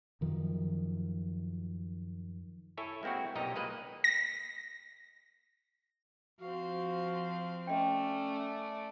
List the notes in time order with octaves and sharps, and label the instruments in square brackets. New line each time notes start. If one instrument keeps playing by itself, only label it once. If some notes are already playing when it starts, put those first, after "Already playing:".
[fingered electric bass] F#2 D#3 F3
[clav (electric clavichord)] E4 A4 C#5 G#5
G#3 A#3 C4 E4 F#4
B1 A#2 D#4 G4 D#5 A#5
G#3 A#3 B4 D#5
[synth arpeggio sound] A#6
[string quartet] F3 C4 [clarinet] F#4 [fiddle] F5
[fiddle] A3 D5 [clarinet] C#4 [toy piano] D#5 G5